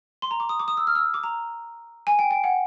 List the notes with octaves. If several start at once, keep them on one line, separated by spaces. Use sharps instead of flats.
C6
A#5
D6
D#6
D6
D#6
E6
F6
E6
D6
A#5
G#5
G5
G5
F#5